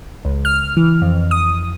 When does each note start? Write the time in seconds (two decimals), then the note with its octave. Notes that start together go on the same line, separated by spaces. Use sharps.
0.25 C#2
0.45 F6
0.77 E3
1.02 F2
1.31 D#6